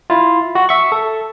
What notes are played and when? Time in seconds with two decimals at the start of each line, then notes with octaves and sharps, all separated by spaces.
0.10 E4 F4
0.55 F#4
0.69 E5 C#6
0.92 A4